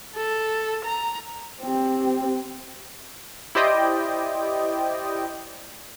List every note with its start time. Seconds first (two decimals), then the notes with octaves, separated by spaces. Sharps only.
0.16 A4
0.85 A#5
1.63 C4 G4
3.55 E4 G4 C5 D5 D#5 G5